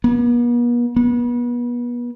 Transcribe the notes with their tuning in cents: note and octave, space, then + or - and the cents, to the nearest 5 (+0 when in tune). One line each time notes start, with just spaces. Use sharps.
B3 -45
B3 -35